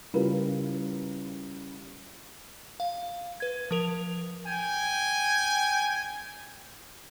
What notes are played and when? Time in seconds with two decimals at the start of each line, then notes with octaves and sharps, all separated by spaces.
0.14 C#3 G3 E4 F4 A#4 B4
2.80 F5
3.40 B4 G#6
3.71 F3 A#4 F7
4.45 G5 G#5